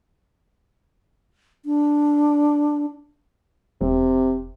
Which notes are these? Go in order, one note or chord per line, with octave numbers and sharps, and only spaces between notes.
D4
E1 C3